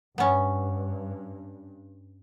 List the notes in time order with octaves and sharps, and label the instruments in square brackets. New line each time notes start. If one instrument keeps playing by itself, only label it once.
[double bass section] G2 [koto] B3 C#4